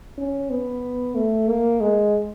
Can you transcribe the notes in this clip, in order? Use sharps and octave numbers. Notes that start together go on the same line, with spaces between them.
C#4
B3
A3
A#3
G#3